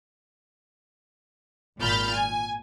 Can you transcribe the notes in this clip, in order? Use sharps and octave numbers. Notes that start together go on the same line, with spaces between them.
G#1 A#2 B5 F6 G6 A6
G#5